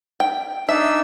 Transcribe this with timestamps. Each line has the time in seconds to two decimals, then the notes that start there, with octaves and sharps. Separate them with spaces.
0.20 G5
0.69 D4 D#4 E5 E6